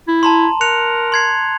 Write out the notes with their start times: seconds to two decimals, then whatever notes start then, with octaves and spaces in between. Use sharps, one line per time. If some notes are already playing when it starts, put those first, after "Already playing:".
0.08 E4
0.23 A5 A#5 C6
0.61 A#4 F#6 C#7 F7
1.12 C6 G#6 C7